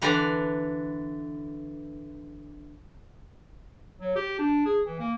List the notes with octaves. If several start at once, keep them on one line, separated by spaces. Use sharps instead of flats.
D3 E3 D4 B4 D5 A#5
F#3
G4
D4
G#4
E3
A#3